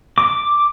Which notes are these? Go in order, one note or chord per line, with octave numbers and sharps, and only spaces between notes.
D6